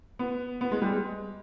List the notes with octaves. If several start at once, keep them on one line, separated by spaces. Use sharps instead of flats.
B3
B3
G#3
G3
G#3